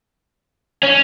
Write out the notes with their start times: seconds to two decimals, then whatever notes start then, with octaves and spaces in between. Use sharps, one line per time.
0.83 C#4